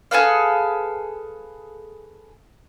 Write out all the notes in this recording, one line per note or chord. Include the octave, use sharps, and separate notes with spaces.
G#4 A4 B4 F5